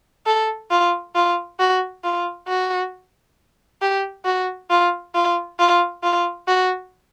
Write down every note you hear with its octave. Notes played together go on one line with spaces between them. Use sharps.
A4
F4
F4
F#4
F4
F#4
G4
F#4
F4
F4
F4
F4
F#4